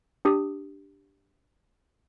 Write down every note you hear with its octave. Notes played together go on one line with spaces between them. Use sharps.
D4 G4 D#6